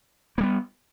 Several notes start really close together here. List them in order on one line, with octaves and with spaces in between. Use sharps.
A#3 G3 B3